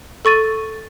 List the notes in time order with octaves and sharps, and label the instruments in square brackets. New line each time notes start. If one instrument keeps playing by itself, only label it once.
[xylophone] A4 C#6 A6 D#7